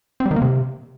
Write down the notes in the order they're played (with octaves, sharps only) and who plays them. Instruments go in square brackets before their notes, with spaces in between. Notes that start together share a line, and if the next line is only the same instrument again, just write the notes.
[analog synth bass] C4
G3
D#3
A#3
C3